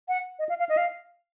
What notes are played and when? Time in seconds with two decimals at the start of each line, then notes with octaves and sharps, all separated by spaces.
0.08 F#5
0.39 D#5
0.49 F5
0.59 F5
0.69 D#5
0.77 F5